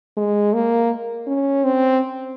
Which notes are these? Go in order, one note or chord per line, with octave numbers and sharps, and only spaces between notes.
G#3
A#3
C#4
C4